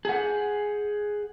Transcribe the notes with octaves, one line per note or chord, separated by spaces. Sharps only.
G#4 F#5